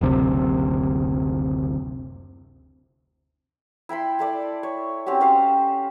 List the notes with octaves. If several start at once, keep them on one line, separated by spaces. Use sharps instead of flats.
F#1 D2 C3
E4 G5 B5 C6
E4 A4 D5
C#5
C4 C#4 F#4 G4
C#4 G4 C5 F5